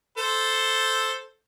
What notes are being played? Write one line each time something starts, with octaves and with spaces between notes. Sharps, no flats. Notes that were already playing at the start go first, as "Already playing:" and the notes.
A4 C5